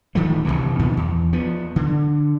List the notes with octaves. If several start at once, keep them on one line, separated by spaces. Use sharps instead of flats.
D1 D#3 F3 A3
F1 D2 C3 E3
A#2 D#3 F3 B3
E2
F3 B3
D3